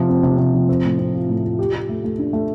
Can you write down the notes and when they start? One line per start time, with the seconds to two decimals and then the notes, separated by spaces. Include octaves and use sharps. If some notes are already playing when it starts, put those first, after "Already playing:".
Already playing: C3 F3
0.09 C4
0.23 C3
0.38 C3
0.54 F3
0.69 C4
0.84 A2
0.98 C4
1.14 F4
1.29 A2
1.44 F4
1.59 G4
1.73 G4
1.89 A3
2.04 A3
2.18 D4
2.33 A3